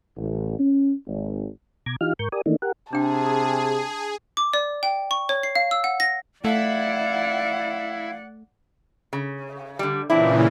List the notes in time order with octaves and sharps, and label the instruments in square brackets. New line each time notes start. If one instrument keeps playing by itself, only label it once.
[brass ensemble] A1
C#4
G#1
[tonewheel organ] B2 A#5 D6 G#6
E3 D#4 F4 G4 F5 F6
G#2 A#4 C#6 G6
G4 A#4 D5 G#5 D#6
D#3 E3 A3 A#3 D4 D#4
G4 A#4 F#5
[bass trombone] C3 [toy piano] D4 G5 [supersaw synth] G#4 [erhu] A5
[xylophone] D6
D5
G5
C#6
C#5
C7
F5
E6
F#5
A#6
[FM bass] A3 [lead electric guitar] E4 [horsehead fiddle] D5 F#5 [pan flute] F5
[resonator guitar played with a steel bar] C#3
D3 G3
[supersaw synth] A#2 C#3 E3 [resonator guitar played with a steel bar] C4 D4 E4